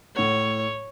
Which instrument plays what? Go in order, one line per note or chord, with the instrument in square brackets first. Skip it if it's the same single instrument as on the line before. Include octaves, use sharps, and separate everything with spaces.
[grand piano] A2 F#5 [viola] C#5